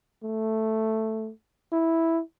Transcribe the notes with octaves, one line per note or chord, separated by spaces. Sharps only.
A3
E4